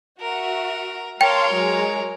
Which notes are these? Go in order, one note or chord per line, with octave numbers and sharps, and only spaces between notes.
F#4 A#4 E5
A#4 C#5 F5 G5 A5 C6
F#3 G#3